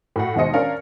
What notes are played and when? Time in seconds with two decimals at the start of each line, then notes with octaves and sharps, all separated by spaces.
0.16 A2 F#4 F#5
0.36 D#2 B2 G#3 C5 D#5 C#7
0.54 C#4 D4 A#4 F5